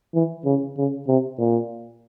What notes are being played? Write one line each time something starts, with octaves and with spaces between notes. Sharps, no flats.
E3
C#3
C#3
C3
A#2